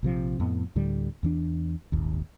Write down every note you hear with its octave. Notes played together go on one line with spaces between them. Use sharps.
A#1 C3 F3
F2 A2 B3
D2 A2 D3 G3
E2 E3 D4
D#1 G#1 D#2